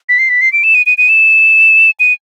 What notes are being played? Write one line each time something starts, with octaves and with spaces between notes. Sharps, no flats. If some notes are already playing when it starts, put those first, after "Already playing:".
B6
C7
B6
C7
D7
E7
D#7
D#7
D#7
E7
D#7